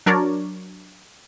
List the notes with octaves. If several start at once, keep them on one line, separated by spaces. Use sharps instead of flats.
F#3 D4 A#4 C#5 D5